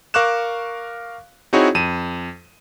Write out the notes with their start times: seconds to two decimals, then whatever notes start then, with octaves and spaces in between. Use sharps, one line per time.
0.14 A#4 F5 C#6 D6 F#6 E7
1.53 C4 D#4 E4 F#4 G#4 C#5
1.75 F2 D#7 E7